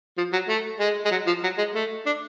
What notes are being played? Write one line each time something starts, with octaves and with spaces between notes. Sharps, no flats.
F3
F#3
A3
G#3
G#3
F#3
F3
F#3
G#3
A3
D4